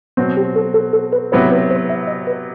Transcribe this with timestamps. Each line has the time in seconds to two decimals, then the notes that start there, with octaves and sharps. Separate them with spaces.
0.17 B2 F#3 B3 C4
0.37 G4
0.56 A4
0.74 A4
0.93 A4
1.13 B4
1.32 C3 F#3 B3 E4 C5
1.51 B4
1.70 C5
1.89 E5
2.07 D#5
2.27 B4